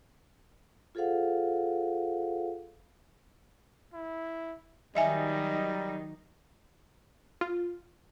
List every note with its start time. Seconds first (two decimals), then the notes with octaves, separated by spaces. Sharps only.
0.95 F4 G#4 A4 C5 F5 F#5
3.93 E4
4.95 D#3 F#3 G3 D#4 D#5 E5 G#5
7.41 F4